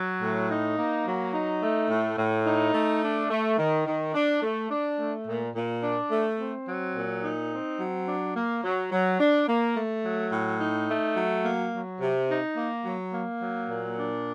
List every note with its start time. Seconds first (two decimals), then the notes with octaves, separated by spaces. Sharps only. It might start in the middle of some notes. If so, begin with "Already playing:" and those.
Already playing: F#3
0.21 A2
0.49 D#4
0.78 A#3
1.06 F#3
1.34 D#4
1.62 A3
1.90 A2
2.18 A2
2.46 D#4
2.74 A3
3.02 D4
3.30 A3
3.58 D#3
3.86 D#3
4.14 D4
4.42 A3
4.70 D4
4.99 A3
5.27 A#2
5.55 A#2
5.83 D4
6.11 A3
6.39 C4
6.68 F#3
6.96 A#2
7.23 D#4
7.52 C4
7.80 F#3
8.08 D4
8.36 A#3
8.64 F#3
8.92 F#3
9.20 D4
9.48 A#3
9.76 A3
10.04 F#3
10.32 A2
10.60 D#4
10.89 A3
11.16 F#3
11.45 A#3
11.73 F#3
12.01 C3
12.29 D#4
12.57 A#3
12.85 F#3
13.13 A#3
13.41 F#3
13.69 A#2
13.98 D4